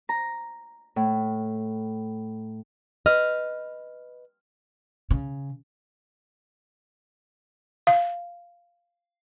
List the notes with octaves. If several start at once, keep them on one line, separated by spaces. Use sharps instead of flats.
A#5
A2
B4 D#5 F6
C#3
F5